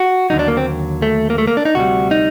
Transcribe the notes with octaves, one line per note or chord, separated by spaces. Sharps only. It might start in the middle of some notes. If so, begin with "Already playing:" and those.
Already playing: F#4
D#2 D3 F#3 D#4
D4
A#3
C4
A3
A#3
A3
A#3
D4
D#4
D2 C3 G3 F#4
D#4